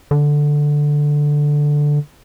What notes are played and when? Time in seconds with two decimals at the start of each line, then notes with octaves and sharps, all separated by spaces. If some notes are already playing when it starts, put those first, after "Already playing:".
0.11 D3